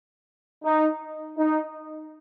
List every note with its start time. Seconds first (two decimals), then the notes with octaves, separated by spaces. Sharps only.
0.63 D#4
1.38 D#4